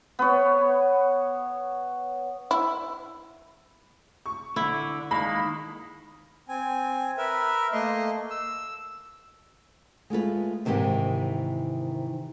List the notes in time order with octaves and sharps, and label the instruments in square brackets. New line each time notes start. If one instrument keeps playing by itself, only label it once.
[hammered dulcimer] B3 C#5
[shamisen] E4
[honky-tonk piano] C#6
[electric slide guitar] D3 [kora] E4
[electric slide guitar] D#3 G#3 A#3 [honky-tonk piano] B5
[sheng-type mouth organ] C4 G#5
A#4 B4 E5
A3 A#3 D#5 C6
E6
[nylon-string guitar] G#3 A3 F4 B4
G#2 C3 D#3 E3 G4